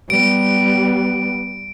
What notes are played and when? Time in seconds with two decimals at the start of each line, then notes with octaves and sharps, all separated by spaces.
0.10 G3 B3 D7